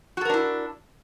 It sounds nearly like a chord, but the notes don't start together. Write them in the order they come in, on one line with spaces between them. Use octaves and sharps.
F#4 A4 A#4 D4 E4